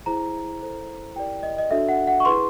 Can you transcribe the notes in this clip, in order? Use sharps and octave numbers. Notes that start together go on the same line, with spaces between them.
E4 G#4 C5 A#5
E4 A4 C5
E4 G4 A#4 D5 G5
D#5
D#5
D4 F#4 A4 D5 E5
F#5
F#5
C#6
E4 G#4 B4 C6